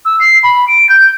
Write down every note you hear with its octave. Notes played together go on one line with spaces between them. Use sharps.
E6
C7
B5
D7
G6